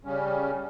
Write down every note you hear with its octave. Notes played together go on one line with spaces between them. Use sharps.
C#3 G3 C#4